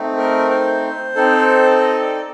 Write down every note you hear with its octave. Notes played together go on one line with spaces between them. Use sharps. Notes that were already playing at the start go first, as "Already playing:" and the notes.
Already playing: A3 C4 D#4
A#4
C5
C4 D#4 A4
D#5
D5